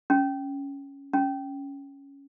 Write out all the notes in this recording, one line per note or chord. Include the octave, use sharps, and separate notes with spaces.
C#4
C#4